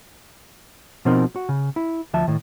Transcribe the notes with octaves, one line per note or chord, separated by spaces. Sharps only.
B2 F3 C4 D#4 A#4
F#4
C#3
E4
D2 F3 E5 A5
A2 D#3